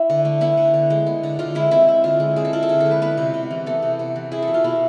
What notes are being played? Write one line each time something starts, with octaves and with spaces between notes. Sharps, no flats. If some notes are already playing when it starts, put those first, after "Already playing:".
Already playing: E4
D3
A3
B3 E4
D3
D3
G#3
B3
D3
D3 F4
G#3 E4
C4 E4
E4
D3 F4
G#3
C4 G#4
A4
E4 F4
A4
D3 G#4
A4
G#3
B4
B3 B4
C3
C3
E3
B3 A4
C3
C3
E3
E4 G#4
A4
B2
F4
B2 E4